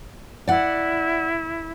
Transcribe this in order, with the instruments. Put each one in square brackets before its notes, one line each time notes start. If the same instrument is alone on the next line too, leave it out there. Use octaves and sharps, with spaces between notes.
[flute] E4 [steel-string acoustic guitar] D5 F#5